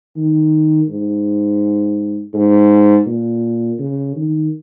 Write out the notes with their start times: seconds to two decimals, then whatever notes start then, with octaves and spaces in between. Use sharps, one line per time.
0.16 D#3
0.89 G#2
2.34 G#2
3.07 A#2
3.79 C#3
4.16 D#3